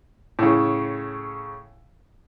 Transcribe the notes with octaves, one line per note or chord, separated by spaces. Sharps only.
A2 C#3